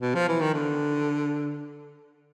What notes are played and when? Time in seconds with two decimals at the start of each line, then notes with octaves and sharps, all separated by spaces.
0.02 B2
0.15 F3
0.28 E3
0.41 D#3
0.54 D3